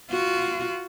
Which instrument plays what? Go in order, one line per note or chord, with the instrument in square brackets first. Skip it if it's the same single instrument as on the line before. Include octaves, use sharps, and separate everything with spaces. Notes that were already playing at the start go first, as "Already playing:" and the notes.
[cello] F4 [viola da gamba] F#4